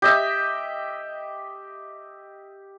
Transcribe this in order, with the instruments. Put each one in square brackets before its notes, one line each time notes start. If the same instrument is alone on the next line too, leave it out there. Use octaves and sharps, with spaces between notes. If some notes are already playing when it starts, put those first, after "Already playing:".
[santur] G4 D#5 E5